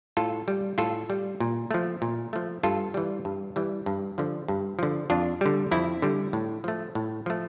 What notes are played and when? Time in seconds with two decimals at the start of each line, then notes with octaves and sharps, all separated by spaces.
0.17 A2 F4 A4
0.48 G3
0.78 A2 F4 A4
1.10 G3
1.40 A#2
1.71 F3 A3
2.02 A#2
2.33 F3 A3
2.63 G2 F4 A4
2.94 E3 G3
3.25 G2
3.56 E3 G3
3.86 G2
4.18 D3 F3
4.48 G2
4.79 D3 F3
5.10 F2 D4 F4
5.41 D3 G3
5.71 F2 C4 E4
6.02 D3 G3
6.33 A2
6.64 F3 A3
6.95 A2
7.26 F3 A3